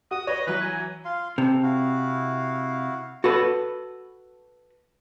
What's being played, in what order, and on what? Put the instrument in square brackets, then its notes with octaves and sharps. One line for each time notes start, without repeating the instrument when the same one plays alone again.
[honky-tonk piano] F#4 [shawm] D#6
[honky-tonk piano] B4 C#5 [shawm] D#5
[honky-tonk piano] E3 F#3 [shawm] B4
[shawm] G#5
[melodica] F4 F5 C6
[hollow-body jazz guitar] C3 [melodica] A4
[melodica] E4 F#4 F5
[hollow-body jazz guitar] F#4 A4 B4